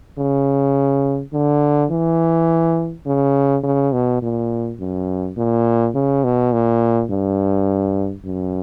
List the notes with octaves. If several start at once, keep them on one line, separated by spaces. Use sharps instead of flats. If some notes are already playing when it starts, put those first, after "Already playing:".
C#3
D3
E3
C#3
C#3
B2
A#2
F#2
A#2
C#3
B2
A#2
G2
F#2